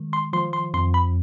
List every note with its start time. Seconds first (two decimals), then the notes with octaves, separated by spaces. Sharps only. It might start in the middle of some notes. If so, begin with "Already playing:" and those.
Already playing: D#3 G#3
0.13 C6
0.33 F3 C6
0.53 C6
0.74 F2 C6
0.94 B5